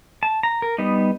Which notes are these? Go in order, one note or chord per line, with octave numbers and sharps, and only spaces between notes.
A5
A#5
A#4
G3 B3 D#4